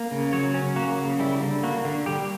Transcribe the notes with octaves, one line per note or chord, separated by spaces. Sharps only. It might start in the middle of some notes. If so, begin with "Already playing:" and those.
Already playing: A#3
C#3
F#3 C#5
C#4
A#3 F#4
C#3
G3 E4
D3
A#3 F#4
D3
G3 G4